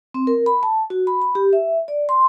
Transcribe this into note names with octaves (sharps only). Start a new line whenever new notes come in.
C4
A#4
B5
A5
F#4
B5
B5
G4
E5
D5
C6